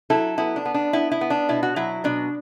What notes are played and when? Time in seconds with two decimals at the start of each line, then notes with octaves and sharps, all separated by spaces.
0.10 F#3 E4 A4
0.38 B3 E4
0.56 D4
0.65 B3
0.74 D4
0.93 B3 E4
1.12 E4
1.21 B3
1.30 D4
1.49 B2 E4
1.63 F#4
1.76 F#3 E4
2.04 B2 D4